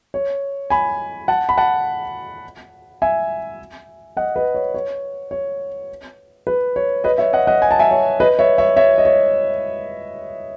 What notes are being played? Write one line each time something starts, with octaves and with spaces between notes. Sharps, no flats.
C#5
G#5 B5
F#5 A5
B5
F#5 A5
E5 G#5
D#5 F#5
B4 D#5
C#5
C#5
C#5
B4
C#5
B4 D#5
C#5 E5
D#5 F#5
D#5 F#5
G#5
A5
E5 G#5
C#5
B4 D#5
C#5 E5
C#5 E5
C#5 E5
D#5
C#5